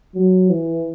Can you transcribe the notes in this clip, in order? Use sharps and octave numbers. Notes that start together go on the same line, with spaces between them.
F#3
E3